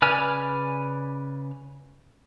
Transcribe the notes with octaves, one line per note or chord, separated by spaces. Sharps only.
C#3 B4 D5 G#5 F6